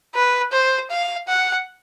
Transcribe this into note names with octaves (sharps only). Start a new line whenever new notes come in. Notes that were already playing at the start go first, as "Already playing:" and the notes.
B4
C5
F5
F#5